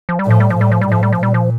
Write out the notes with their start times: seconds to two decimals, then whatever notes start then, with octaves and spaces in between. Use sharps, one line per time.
0.09 F3
0.19 G3
0.25 A2
0.31 F3
0.40 G3
0.50 F3
0.56 A2 G3
0.72 F3
0.81 G3
0.88 A2 F3
1.03 G3
1.13 F3
1.20 A#2 G3
1.34 F3